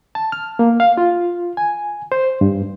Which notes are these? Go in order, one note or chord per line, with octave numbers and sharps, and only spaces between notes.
A5
F6
A#3
F5
F4
G#5
C5
G2